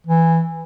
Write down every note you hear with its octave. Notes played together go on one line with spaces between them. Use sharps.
E3